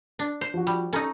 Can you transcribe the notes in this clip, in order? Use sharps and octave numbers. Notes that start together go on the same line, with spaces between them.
D4
C5
F3 F#4
G3
C#4 D#4 A4 A#5